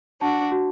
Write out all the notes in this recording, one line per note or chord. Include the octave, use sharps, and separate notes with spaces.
D4 F#4 A5
F#4